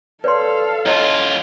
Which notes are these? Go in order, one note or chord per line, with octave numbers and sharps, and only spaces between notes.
A4 B4 C#5 D5 F5 C6
F#2 E4 F4 C#5 D#5